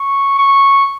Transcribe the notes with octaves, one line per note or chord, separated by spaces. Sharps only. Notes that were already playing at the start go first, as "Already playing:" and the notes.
Already playing: C#6
C#6